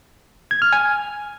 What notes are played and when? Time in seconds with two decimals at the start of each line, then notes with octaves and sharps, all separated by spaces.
0.51 G#6
0.62 F6
0.73 G#5